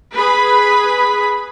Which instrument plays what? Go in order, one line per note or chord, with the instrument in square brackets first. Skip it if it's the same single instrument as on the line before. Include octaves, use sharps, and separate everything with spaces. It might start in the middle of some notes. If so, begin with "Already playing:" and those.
[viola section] G#4 B4 B5